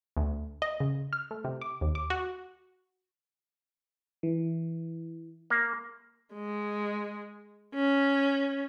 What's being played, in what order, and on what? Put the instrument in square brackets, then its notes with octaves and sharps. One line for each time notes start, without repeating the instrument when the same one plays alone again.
[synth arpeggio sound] D2
D#5
C#3
F6
A3
C3
D6
D#2
D6
F#4
[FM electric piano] E3
[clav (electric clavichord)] A#3
[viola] G#3
C#4